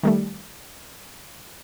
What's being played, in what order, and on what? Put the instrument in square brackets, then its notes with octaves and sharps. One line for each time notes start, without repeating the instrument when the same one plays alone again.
[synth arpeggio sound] D#3 G3 A3